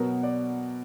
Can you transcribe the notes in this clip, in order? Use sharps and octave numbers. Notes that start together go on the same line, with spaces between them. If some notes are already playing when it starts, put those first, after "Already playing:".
Already playing: B2 F#3 B3 A#4
D5